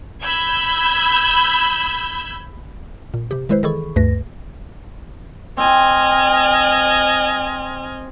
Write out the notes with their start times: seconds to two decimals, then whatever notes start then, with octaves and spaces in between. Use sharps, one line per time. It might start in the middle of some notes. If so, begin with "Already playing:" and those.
0.23 B5 E6 G6 G#6
3.14 A#2
3.31 C3 G4
3.49 D#3 G#3 E4 B4 C5
3.63 D#3 E3 G#4 A4 B5 C#6
3.96 D2 G2 A3 B4 A#6
5.57 C4 D#5 G#5 F6